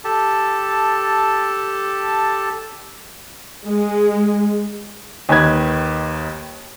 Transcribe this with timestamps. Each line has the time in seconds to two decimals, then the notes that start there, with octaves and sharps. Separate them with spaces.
0.04 G4 A4 A5
3.65 G#3
5.29 D#2 D#3 B4 G#6